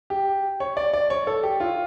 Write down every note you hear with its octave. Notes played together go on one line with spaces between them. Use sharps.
G4
C#5
D5
D5
C#5
A4
G4
F4